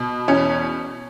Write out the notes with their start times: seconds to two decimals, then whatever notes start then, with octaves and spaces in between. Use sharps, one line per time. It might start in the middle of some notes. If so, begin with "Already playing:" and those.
Already playing: B2
0.28 E2 C#4